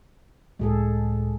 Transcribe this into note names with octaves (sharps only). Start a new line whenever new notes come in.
C#2 A2 G#3 G#4 A4